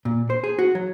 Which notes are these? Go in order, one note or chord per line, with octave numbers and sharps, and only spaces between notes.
A#2
C5
G#4
F#4
F#3